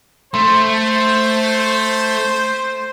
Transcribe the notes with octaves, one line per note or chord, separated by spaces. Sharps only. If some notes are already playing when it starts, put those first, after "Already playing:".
A3 C5 C6